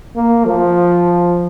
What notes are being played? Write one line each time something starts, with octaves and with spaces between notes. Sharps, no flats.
A#3
F3